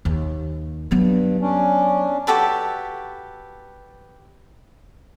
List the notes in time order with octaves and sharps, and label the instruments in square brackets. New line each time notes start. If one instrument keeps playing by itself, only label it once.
[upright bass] D#2
[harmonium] G2 [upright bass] F#3 B3
[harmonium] C#4 D4
[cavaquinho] F#4 G4 A4 B4